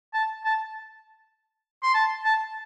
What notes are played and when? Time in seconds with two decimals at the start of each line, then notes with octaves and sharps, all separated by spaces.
0.13 A5
0.44 A5
1.83 C6
1.94 A5
2.24 A5